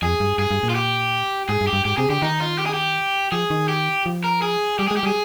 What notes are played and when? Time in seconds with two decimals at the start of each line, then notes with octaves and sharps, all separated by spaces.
0.02 F2 G#4
0.20 G2
0.38 G2 G#4
0.51 G2
0.63 A#2
0.70 F4
0.76 G4
1.49 G#2 G#4
1.61 G2
1.67 G4
1.73 G2
1.85 G#2 G4
1.97 C3 G#4
2.10 D3 G4
2.22 D#3 D#4
2.40 F4
2.58 G4
2.66 G#4
2.74 G4
3.32 F3 G#4
3.50 D#3
3.68 G4
4.06 F3
4.24 A#4
4.42 G#4
4.79 G3 G4
4.88 G#3 G#4
4.97 G4
5.03 G3 G#4